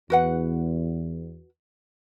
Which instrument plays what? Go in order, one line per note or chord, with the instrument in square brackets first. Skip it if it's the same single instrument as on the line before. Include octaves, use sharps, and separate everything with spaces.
[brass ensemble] E2 [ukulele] F#4 B4 F#5